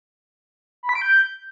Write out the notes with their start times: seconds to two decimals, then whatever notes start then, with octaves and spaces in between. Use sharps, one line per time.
0.83 B5
0.89 B6
0.95 D7
1.02 G6